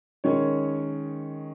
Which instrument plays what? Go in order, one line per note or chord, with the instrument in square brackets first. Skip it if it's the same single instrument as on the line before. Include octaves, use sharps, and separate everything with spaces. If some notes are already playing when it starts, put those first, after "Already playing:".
[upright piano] D#3 G#3 C#4 C#5